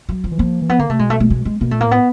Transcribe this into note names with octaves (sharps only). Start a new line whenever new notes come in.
F#3
F3
E3
F3 A#3
E3
F3 B3
D3 A#3
C3 A3
B2 G#3
A3
A3
G#3
G#3
B2 A#3
A#2 A3
A#3
A2 B3